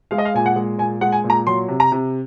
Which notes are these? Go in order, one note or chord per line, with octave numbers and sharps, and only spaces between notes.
G#3 F5
D#5
F5
A#2 G#5
F#5
G#3
A#2 G#5
G#3 F#5
G#5
A#2
A#5
F#3 C6
C3
A#5
C3